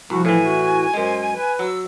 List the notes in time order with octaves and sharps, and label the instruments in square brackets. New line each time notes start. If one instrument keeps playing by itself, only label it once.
[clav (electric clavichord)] C2 [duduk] F3 [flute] F#4
[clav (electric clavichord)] A2 E3 [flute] G#5
[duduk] F#4
[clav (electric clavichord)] F#2 G#3 [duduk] C5
[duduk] B4
[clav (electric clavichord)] F#3 [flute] E6